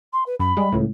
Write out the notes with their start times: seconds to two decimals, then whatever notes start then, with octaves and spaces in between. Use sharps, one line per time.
0.13 C6
0.26 B4
0.40 F#2 B5
0.57 G3 G#3
0.72 C#2 A2